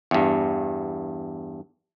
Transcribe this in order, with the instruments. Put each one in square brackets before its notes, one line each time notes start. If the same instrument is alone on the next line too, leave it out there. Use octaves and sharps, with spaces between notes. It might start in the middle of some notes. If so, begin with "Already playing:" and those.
[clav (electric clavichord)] E2 G2